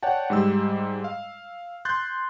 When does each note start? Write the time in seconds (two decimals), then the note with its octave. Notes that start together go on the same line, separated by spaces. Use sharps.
0.03 C#5 D5 F#5 G5 A5
0.30 G#2 G3 E6
1.04 F5
1.85 C6 F#6 G6 A6